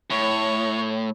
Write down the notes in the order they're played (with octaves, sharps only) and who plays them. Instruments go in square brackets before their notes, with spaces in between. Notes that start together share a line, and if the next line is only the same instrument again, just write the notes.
[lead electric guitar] A2 [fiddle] C#5